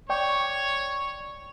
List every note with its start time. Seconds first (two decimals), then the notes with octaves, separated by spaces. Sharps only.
0.10 C#5 D5 G5 C#6